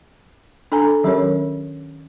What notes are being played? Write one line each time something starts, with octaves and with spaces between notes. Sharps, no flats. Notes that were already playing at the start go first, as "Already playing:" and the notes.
D4 A4 G#5 A#5
D#3 F#3 C#4 G4 A#4 C#5